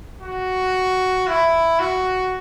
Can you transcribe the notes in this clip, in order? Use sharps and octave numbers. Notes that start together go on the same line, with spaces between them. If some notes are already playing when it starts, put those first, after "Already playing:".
F#4
E4
F#4